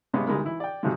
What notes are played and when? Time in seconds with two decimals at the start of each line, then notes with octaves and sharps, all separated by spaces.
0.14 G2 C3 G#3 B3 C#4
0.27 D2 G3 G#3 D#4 A#4 B5
0.45 E3 E4
0.60 D5 G5
0.83 G#2 C3 D#3 F3 F#3 G#3